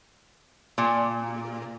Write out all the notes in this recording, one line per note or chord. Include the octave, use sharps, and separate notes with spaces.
A#2